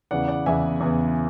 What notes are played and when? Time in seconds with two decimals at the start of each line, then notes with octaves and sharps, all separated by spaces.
0.11 E2 C#3 E3 B3 D5 F#5
0.28 D5 F#5
0.46 E2 C#3 E3 B3 E5 G#5
0.81 E2 C#3 E3 B3